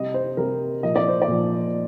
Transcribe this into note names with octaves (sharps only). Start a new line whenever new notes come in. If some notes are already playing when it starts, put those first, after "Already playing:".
Already playing: C3 G3 D#5
C5
C3 G3 A#4
A#2 F3 D#5
D5
C5
D5
A#2 F3